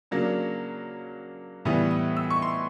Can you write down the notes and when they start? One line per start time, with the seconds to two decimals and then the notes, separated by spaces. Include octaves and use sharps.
0.11 C#3 F#3 A#3 D4
1.65 A2 E3 G3 B3 D#6
1.91 D#6
2.16 E6
2.30 C#6
2.42 C6